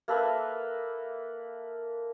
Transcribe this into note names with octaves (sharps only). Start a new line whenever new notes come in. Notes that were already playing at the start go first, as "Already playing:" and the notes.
A#3 A4 B4 E5